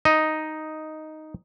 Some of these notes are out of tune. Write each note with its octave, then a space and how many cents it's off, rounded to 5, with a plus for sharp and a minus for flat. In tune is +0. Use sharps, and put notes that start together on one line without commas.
D#4 +0 D#5 +5